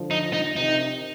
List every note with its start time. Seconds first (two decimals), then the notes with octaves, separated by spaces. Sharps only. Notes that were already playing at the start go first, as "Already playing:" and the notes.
Already playing: D3 F3
0.11 D#4
0.33 D#4
0.56 C3 D#3 D#4